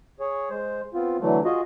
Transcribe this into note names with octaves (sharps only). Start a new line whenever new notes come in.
G#4 C#5
G#3 C5
B3 C4 F4
D3 E3 F#3 A3
F4 F#4 G#4 D#5